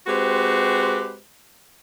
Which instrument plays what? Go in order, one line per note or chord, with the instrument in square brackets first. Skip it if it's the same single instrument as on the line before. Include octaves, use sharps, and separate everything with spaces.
[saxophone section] G#3 C4 F#4 G4 B4 C5